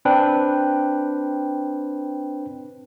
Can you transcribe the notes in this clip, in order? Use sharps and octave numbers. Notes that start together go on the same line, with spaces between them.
C4 D4 B4 G5